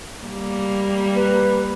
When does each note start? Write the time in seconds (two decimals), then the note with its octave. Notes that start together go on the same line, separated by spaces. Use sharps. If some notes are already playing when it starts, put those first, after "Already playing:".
0.24 G3 A#3
1.15 B4